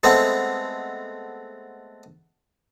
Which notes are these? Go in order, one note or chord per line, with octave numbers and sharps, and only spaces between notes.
G#3 A3 B3 C4